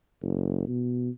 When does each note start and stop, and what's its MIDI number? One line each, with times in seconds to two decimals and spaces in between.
0.22 0.63 30
0.68 1.10 47